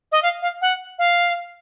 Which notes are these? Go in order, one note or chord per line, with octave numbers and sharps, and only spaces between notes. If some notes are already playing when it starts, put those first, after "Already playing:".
D#5
F5
F5
F#5
F5